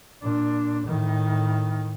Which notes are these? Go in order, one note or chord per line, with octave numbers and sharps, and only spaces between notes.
A#2 D4
A2 D#3